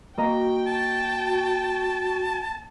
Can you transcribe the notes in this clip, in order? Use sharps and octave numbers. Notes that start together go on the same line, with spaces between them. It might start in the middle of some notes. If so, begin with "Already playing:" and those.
A#3 F#4 D#5 G5 A#5
A5